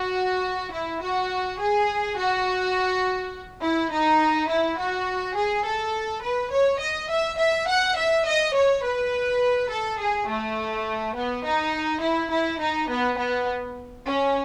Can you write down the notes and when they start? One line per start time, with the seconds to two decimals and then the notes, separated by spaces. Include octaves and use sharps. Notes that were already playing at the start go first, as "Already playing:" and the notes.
Already playing: F#4
0.73 E4
1.02 F#4
1.60 G#4
2.18 F#4
3.63 E4
3.92 D#4
4.50 E4
4.79 F#4
5.37 G#4
5.65 A4
6.24 B4
6.52 C#5
6.81 D#5
7.11 E5
7.39 E5
7.68 F#5
7.97 E5
8.27 D#5
8.55 C#5
8.84 B4
9.71 A4
9.99 G#4
10.28 A3
11.16 B3
11.45 D#4
12.03 E4
12.31 E4
12.61 D#4
12.90 B3
13.18 B3
14.06 C#4